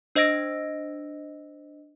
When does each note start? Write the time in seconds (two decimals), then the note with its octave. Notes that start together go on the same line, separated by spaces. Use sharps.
0.15 D4 C5 D#5 E6 A#6 D7